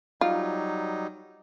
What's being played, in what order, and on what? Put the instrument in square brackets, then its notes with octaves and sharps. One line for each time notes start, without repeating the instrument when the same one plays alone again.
[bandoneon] F#3 G3 D#4 [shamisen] F4